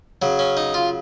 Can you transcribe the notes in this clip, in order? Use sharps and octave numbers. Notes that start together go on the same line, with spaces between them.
C#3 F#3
C#4
D#4
F4